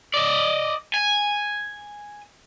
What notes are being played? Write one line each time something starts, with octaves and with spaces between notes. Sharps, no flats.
D5 D#5
G#5